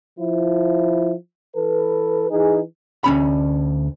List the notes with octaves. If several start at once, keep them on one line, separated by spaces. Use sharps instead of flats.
F3 E4
E3 A4 B4
E3 D#4 G#4
D2 C#4 B5